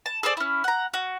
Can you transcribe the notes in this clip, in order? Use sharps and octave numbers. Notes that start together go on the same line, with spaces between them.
A5
G#4 A4 C5 D5
C#4 E4
F#5 A#5
F#4